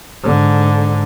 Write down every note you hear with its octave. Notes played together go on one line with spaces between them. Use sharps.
G#2 D3